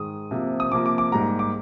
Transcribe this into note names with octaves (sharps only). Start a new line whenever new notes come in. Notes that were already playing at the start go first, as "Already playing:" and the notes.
Already playing: G#2 D#3 G#3 D#6
C3 F3 A#3
D#6
C3 F3 A#3 D6
D6
D6
G#2 G3 A#3 A#5
D6